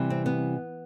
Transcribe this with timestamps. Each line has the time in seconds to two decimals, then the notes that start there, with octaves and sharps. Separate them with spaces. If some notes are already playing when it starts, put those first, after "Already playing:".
Already playing: C3 E3 G3
0.10 C4
0.26 B3